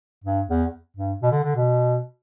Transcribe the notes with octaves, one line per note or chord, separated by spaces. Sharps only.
G2
E2
G2
B2
D3
D3
B2